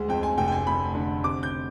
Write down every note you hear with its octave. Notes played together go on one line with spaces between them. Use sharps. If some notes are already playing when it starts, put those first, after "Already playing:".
Already playing: D2 G#3
F2 G5
G#5
F1 G5
G5
G#5
F1 B5
D3
C3 D6
G6